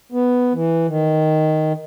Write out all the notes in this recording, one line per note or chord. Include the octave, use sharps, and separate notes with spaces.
B3
E3
D#3